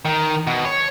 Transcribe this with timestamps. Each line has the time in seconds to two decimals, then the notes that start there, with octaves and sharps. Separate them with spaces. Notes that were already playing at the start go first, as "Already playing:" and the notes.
0.05 D#3
0.47 B2
0.65 C#5